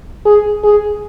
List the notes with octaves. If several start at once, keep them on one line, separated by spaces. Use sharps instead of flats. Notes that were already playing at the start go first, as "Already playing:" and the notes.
G#4
G#4